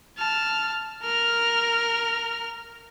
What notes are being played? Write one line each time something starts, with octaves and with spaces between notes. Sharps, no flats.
A5 F6
A#4 F6